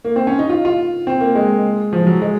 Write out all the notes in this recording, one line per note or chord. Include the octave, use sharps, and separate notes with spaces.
A#3
C4
C#4
D#4
F4
F4
C4
A#3
G#3
F3
F#3
G#3